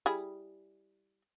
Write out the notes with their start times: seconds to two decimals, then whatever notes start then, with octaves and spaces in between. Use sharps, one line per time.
0.06 G3 E4 G#4